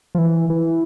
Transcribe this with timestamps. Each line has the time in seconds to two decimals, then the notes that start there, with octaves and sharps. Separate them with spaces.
0.15 F3
0.18 E3
0.50 E3